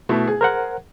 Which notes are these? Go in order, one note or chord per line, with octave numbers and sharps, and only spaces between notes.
B2 A3 E4
G#4
A#4 C5 F#5